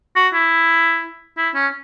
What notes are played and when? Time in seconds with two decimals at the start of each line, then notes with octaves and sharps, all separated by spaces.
0.16 F#4
0.34 E4
1.37 E4
1.55 C#4